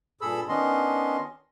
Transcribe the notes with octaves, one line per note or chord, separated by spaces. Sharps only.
G2 A#2 G#4 A4 B5 E6
D#3 B3 C#4 D4 D#5 C6